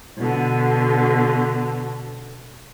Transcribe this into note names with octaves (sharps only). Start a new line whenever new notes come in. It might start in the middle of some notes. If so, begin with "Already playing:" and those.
B2 D3